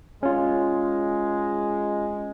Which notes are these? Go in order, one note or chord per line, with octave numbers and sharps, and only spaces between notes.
G#3 C#4 F4